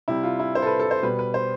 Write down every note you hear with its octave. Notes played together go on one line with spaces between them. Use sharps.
C3 G3 E4
F4
E4
C5
A4
B4
A4
C5
B2 G3 B4
B4
C5